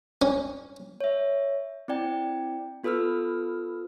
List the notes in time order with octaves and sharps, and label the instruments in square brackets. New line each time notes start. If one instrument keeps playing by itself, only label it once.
[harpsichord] C#4
[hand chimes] C#5 E5
C4 E4 D5 G5
B3 F4 A4 B4 E6 F6